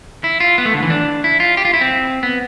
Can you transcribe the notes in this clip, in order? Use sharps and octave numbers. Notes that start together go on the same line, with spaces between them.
E4
F4
B3
A3
D3
E3
D4
E4
F4
G4
F4
E4
C4
B3